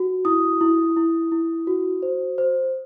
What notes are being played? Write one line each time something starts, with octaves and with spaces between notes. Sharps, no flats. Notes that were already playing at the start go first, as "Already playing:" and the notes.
Already playing: F#4
E4 D#6
E4
E4
E4
F#4
C5
C5